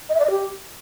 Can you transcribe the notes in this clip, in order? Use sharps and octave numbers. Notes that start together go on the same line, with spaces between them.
D#5
E5
D5
D#5
G4